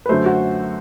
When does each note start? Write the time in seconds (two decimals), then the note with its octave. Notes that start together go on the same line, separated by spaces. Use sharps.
0.06 B4
0.09 F#2 D3 F#3 A3 C5
0.26 F#4